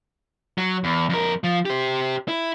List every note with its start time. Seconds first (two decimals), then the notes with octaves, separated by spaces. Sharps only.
0.58 F#3
0.84 E2
1.09 F2 A#4
1.44 F3
1.66 G4 C5
2.28 E4